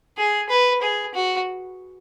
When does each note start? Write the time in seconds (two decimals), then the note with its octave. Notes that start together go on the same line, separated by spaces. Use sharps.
0.18 G#4
0.50 B4
0.82 G#4
1.14 F#4